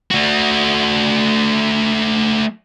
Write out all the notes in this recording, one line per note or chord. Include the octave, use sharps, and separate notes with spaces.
A3 F#4